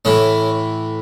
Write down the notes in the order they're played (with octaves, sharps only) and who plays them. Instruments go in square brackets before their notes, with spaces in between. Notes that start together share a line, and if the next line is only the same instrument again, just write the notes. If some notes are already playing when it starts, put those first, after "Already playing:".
[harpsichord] A2 E3 C#4